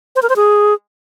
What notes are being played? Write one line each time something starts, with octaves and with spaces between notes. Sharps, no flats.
C5
A#4
C5
G#4